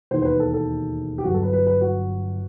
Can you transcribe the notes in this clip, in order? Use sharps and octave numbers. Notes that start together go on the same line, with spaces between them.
E1 D#2 D#3 C5
C5
B4
A4
A4
G4
G1 G2 F#3 F#4
A4
B4
B4
B4
F#4